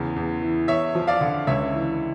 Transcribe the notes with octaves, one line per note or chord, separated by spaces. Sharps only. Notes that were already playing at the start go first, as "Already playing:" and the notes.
Already playing: E2 C#3
E2
E3
E2 C#5 E5
F3
D5 F5
D3
C#2 C#5 E5
E3